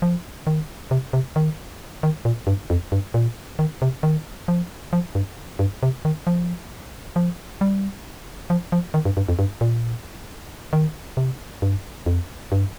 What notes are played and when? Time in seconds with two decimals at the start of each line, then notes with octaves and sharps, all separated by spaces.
0.02 F3
0.47 D#3
0.91 C3
1.13 C3
1.36 D#3
2.03 D#3
2.25 A#2
2.47 G2
2.70 F2
2.92 G2
3.14 A#2
3.59 D#3
3.82 C3
4.03 D#3
4.48 F3
4.93 F3
5.15 G2
5.59 G2
5.83 C3
6.05 D#3
6.27 F3
7.16 F3
7.61 G3
8.50 F3
8.72 F3
8.94 D#3
9.05 G2
9.17 G2
9.28 F2
9.39 G2
9.61 A#2
10.73 D#3
11.17 C3
11.62 G2
12.06 F2
12.52 G2